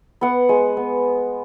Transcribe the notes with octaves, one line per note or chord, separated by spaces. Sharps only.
B3 F#5
G#3
B3